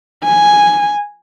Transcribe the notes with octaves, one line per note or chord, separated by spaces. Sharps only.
G#5